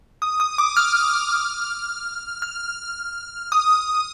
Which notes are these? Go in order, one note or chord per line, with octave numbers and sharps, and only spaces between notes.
D#6
D#6
D6
F6
F6
D#6